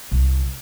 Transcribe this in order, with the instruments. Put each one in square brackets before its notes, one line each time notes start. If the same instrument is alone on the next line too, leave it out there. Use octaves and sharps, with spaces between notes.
[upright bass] C2